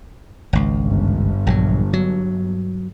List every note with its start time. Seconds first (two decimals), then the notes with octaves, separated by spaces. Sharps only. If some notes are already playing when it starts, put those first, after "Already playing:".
0.53 G#1 C#2
0.83 G1
1.47 A#1 D3 F#3
1.93 F#3